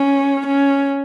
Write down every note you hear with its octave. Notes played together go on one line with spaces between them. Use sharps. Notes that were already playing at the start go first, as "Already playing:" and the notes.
Already playing: C#4
C#4